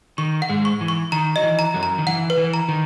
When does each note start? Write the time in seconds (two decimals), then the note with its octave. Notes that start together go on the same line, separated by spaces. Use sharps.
0.18 D#3 C#6
0.42 F#5
0.50 G#2 G#3
0.65 C#6
0.81 E3
0.88 C#6
1.12 D#3 A#5
1.36 F#3 D#5
1.43 E3
1.59 A#5
1.74 F#2 F#3
1.83 A#5
1.98 D#3
2.06 E3 F#5
2.30 B4
2.38 E3
2.54 A#5
2.69 D#3